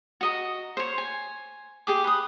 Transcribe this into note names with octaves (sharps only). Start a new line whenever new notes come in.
F#4 D#5 A#5
C5 C#5
G#5
G4 G#4 D6
B4 D#6